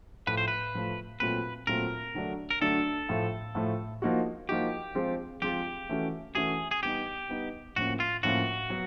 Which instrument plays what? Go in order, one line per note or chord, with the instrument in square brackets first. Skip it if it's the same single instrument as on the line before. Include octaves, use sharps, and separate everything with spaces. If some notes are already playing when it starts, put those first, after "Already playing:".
[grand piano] A2 F3 A3 [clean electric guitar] B4
[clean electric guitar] C5
B4
[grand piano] A2 F3 A3
[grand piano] A#2 F#3 A3 C4 F4 [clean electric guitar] B4
[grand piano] A#2 F#3 A3 C4 F4 [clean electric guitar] A#4
[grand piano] D3 F#3 A3 D4
[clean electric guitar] A#4
[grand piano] D3 F#3 A3 D4 [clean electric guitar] A4
[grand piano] A2 F3 A3
A2 F3 A3
F3 A#3 D#4 F#4
[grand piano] F3 A#3 D#4 F#4 [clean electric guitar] G4
[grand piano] F3 G#3 C4 F4
[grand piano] F3 G#3 C4 F4 [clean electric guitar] G4
[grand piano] E3 A3 C#4 F#4
[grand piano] E3 A3 C#4 F#4 [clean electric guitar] G#4
[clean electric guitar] G#4
[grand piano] G3 B3 D#4 [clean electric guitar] G4
[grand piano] G3 B3 D#4
[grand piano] A2 F3 A#3 C#4 [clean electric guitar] F#4
[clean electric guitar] F4
[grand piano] A2 F3 A#3 C#4 [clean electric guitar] F#4
[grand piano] F#3 B3